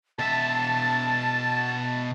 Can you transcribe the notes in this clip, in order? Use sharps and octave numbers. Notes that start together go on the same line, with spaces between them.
B2 E5 A5 A6